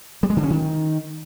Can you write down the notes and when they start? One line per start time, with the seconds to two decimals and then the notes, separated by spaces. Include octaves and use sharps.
0.23 G3
0.30 G#3
0.37 D3
0.43 C#4
0.50 D#3